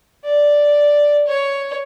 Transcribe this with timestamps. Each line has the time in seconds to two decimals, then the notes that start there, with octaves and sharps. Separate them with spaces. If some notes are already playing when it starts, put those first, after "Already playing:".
0.25 D5
1.28 C#5